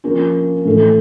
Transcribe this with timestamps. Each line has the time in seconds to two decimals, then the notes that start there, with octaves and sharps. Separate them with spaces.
0.04 F3 A#3 C#4 F4
0.65 A2 E3 A3